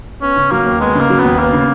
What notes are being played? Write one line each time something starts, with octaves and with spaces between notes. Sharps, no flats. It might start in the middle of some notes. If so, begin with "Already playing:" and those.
B3 C#4
C#3
F#3 A#3
D#2
G#3 B3
C#3 A#3
F#3
D#2 B3
A#3 B3
C#3